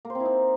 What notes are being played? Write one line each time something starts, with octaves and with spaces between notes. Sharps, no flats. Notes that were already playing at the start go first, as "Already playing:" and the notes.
A#3
C5
C4
E4
D#4